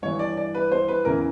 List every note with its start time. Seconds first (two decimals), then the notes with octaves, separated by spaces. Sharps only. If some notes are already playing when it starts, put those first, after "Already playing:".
0.02 G2 E3 C#5
0.19 D5
0.37 D5
0.55 B4
0.72 C5
0.88 B4
1.05 E2 C#3 E3 A#4